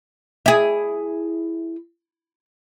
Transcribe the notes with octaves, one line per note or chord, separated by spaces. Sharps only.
E4 G#4